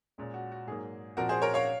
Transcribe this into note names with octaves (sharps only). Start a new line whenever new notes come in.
A#2 G#3 C#4
F#4
F#4
G#2 F#3 A#3 G#4
A#2 F3 C4 F#4 A#4
G#4 C5
A#4 C#5
C#5 F5